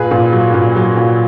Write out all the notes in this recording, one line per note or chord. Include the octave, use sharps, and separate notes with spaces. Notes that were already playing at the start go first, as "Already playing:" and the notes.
Already playing: A#2 G#4 B4
A#2
F#3
A#2
F#3
A#2